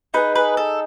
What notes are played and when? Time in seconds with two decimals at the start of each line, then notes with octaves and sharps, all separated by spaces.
0.14 D#4 G#4 B4
0.36 B4
0.57 A4